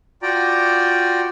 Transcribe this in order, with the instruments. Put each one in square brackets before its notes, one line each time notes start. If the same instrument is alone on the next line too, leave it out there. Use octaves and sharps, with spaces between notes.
[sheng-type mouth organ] F4 F#4 D5 G5 A#5